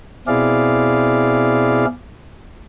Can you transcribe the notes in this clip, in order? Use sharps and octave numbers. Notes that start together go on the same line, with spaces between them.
B2 C4 E4 G#4 D5 F5